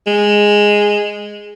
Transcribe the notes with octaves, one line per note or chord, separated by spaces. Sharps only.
G#3